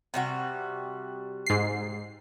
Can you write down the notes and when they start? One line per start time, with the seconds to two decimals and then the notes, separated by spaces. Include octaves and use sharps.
0.14 C3 G3 F#4
1.47 G#2 C7